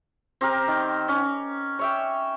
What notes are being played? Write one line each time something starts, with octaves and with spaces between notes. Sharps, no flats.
C4 G4 A#4
D#3
C#4
C#5 E5 G5